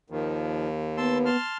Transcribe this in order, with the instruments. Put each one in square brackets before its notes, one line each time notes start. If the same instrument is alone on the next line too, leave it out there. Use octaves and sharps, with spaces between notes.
[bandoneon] D#2 [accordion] D#3 F3
[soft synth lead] B3 [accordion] A5 C6 E6
[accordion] A5 C6 F6